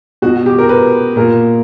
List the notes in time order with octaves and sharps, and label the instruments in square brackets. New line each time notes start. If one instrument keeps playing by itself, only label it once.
[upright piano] B2 F#4
G4
A#4
B4
A#2 A#4